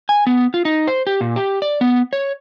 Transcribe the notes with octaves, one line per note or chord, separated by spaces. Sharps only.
G#5
B3
F4
D#4
C5
G4
A#2
G4
D5
B3
C#5